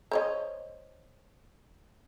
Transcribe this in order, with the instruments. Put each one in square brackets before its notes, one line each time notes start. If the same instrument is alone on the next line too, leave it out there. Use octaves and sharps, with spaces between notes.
[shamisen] C5 C#5 D#5